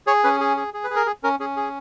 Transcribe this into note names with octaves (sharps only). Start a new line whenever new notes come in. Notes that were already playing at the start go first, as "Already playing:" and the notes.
G#4 C#5
C#4 B4
G#4
G#4
G#4
B4
G#4
A#4
G#4
C#4 A#4
C#4 G#4
G#4